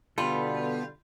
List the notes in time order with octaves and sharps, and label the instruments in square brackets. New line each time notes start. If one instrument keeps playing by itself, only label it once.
[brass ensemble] B2 D3 [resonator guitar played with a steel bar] G3 F4 [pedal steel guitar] B3 A4